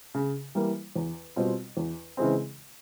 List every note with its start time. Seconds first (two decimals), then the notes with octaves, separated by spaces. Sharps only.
0.14 C#3
0.55 E3 G3 A#3
0.96 E2
1.36 B2 G3 C4 F4
1.77 E2
2.17 C#3 E3 G#3 C4